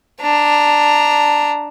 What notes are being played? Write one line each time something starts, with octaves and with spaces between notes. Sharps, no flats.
D4 A#5